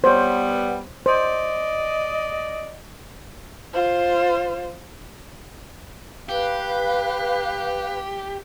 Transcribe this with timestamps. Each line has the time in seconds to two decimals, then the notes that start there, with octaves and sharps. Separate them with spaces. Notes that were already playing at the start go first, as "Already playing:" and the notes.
0.04 G3 B3 C5 C#5
1.06 C5 D5 D#5
3.73 F4 C5
6.29 G4 B4 F5